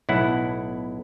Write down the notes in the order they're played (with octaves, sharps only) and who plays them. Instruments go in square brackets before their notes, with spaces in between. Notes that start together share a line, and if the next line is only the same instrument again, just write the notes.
[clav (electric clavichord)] B1 A2 E4 F#5